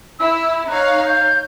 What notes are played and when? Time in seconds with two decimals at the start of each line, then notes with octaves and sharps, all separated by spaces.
0.19 E4 E6
0.68 D#4 C#5 F5 F#6
1.06 G6